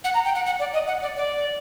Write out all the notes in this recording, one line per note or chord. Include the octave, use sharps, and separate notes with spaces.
F#5
A#5
G5
F#5
F#5
D5
D#5
F#5
D5
D5